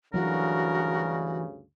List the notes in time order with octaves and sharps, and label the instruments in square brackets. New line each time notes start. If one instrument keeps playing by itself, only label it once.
[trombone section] D2 G2 C#3 [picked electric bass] E3 F#3 [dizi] F#4 [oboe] A#4